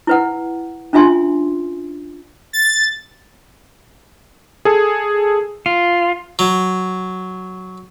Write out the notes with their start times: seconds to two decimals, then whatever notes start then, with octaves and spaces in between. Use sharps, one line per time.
0.07 E4 B4 F#5
0.93 C#4 D4 F4 E5 G#5 C6
2.53 A6
4.65 G#4 A4
5.66 F4
6.39 F#3